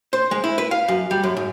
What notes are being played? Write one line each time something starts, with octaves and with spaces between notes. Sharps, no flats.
C5
G#3
E4
B4
F5
F#2
G3
F#2
G#2